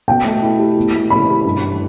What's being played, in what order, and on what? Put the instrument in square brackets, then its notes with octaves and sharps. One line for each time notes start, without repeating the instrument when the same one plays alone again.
[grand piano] B2 [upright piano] G5
[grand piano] A3
E4
G4
B2
A3
[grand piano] E4 [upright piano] B5
[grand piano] G4
G2
E3